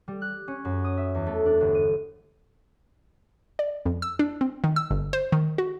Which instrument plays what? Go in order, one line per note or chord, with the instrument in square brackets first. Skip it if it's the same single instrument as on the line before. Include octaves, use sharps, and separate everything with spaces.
[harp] G3
F#6
C#4
F#2
D#6
E5
E2
A3
D4
G1
D#7
[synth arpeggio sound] D5
F2
E6
D4
C4
D#3
E6
G1
C5
D#3
F#4